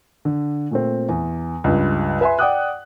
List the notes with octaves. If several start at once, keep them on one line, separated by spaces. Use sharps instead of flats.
D3
A#2 A3 C4
E2
C#2 G2
B4 E5 G#5 B5 C6
D5 F#5 G5 D6 D#6 F#6